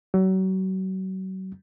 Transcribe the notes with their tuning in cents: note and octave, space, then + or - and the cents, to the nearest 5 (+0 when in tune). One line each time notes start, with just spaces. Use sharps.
F#3 +35